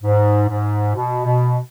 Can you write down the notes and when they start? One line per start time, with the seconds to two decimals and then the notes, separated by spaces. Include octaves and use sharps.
0.02 G#2
0.48 G#2
0.94 B2
1.24 B2